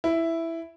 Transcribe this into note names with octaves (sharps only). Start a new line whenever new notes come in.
E4